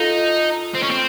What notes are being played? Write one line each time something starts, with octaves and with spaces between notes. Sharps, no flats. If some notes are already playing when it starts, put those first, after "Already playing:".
Already playing: D#4 F4 A4
C4
C#4
C4